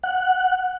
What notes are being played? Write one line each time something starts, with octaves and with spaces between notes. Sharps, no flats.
F#5